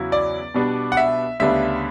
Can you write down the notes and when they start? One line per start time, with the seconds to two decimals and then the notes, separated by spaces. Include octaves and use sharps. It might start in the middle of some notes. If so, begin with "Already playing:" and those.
Already playing: E2 C#3 F#3 C#4 E4
0.12 D5
0.54 B2 G3 B3 D4
0.92 F#5
0.97 E5
1.40 D2 C#3 G3 B3 D4 E5